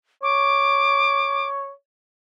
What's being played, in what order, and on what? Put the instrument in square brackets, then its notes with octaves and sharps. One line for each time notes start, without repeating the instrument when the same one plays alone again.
[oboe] C#5 [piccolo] D6